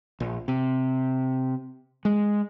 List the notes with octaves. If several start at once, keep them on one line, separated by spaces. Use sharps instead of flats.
A#1
C3
G#3